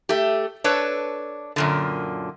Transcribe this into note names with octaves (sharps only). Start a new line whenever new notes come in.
A3 G4
D4 A4 B4 C#5
F#2 A#2 D3